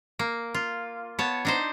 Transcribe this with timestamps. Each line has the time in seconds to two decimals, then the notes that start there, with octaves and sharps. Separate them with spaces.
0.19 A#3
0.54 F4
1.19 B3 C#5 A5
1.45 D4 D#4 C5